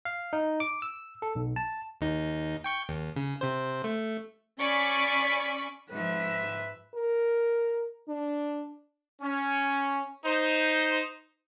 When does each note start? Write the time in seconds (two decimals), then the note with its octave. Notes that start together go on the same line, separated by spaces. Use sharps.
0.05 F5
0.33 D#4
0.60 D6
0.82 E6
1.22 A4
1.35 B1
1.56 A5
2.01 D#2 D#4
2.64 G5 C#6 G6
2.89 D#2
3.16 C#3
3.41 C3 C5
3.84 A3
4.60 C#4 D5 G#5 B5 C#6
5.91 G#2 F3 B4 E5
6.94 A#4
8.08 D4
9.21 C#4
10.25 D#4 C5